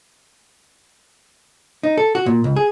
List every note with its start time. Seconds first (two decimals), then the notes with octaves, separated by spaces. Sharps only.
1.83 D#4
1.98 A4
2.15 F#4
2.26 A#2
2.44 C#2
2.56 G#4